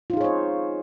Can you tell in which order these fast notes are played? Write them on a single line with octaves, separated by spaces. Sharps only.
F4 D#4 G#4 C#5 C5